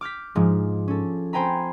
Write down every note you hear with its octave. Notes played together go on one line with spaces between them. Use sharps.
D6 F6 G6 B6
G#2 F3 G#3
C#4 A4
C4 C5 G5 G#5 A#5 B5